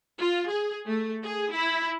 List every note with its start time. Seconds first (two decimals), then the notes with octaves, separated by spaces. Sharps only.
0.20 F4
0.50 G#4
0.87 A3
1.24 G#4
1.52 E4